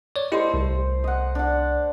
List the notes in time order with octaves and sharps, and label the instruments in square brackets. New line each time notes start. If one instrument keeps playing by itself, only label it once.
[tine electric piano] C#5 D5
[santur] A3 C5 [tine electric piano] E4 G4 D#5
[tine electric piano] C2
[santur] D#5 F#5
D4 F#5